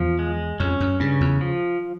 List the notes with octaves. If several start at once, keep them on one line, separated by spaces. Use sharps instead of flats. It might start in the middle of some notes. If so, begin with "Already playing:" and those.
Already playing: E2 F3
G#3
F2 C#4
F#2
G2 C#3
E2
F3